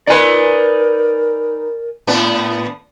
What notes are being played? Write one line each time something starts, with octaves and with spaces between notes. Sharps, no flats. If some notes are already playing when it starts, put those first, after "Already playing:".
D#4 A#4 B4 D5 G#5
A2 B3 D4